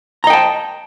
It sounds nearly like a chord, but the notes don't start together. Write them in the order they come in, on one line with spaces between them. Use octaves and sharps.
A#5 D#5 G5 A5